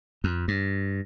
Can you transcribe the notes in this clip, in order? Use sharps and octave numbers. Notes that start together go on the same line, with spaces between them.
F2
G2